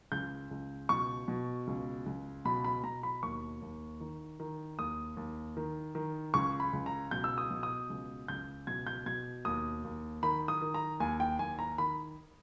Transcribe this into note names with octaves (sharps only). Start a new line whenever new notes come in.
C#2 G6
C#2
B2 C#6
B2
C#2
C#2
B2 B5
B5
B2 A#5
B5
D#2 C#6
D#2
D#3
D#3
D#2 D#6
D#2
D#3
D#3
C#2 C#6
B5
C#2
A#5
B2 G6
E6
D#6
B2
D#6
C#2
C#2 G6
B2 G#6
G6
B2 G#6
D#2 D#6
D#2
D#3 B5
D#6
D#3
A#5
D#2 G#5
G5
D#2 G#5
A#5
D#3 B5